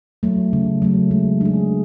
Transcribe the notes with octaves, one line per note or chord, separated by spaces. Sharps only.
F#3 A3
C#3
F#3 A3
G#3
D4 G#4